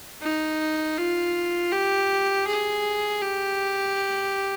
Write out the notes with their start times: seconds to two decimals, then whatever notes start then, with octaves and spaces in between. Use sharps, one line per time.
0.22 D#4
0.97 F4
1.72 G4
2.47 G#4
3.22 G4